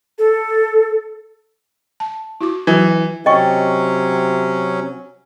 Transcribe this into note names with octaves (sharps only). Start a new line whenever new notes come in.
A4
A5
E4 F#4 D6
E3 F#3 F#4
C3 F#3 C#4 D#5 G5 C#6